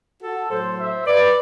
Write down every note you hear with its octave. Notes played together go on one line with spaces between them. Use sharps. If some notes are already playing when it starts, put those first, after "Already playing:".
F#4 A4
A2 F#3 A4 C5
C5 E5
B4 D5